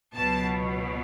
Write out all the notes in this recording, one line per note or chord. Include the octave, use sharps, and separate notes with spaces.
C#2 B2 F#3 A5